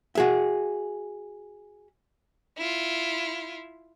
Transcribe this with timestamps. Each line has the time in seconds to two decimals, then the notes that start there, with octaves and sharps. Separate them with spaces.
0.15 F#4 G#4 E5
2.58 E4 F4